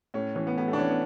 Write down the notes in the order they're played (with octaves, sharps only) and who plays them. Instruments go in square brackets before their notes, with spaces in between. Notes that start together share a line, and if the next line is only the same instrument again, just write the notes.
[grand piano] A2 C#4
E3 C#4
B3
A2 B3
A3
D4
E3 C#4
B3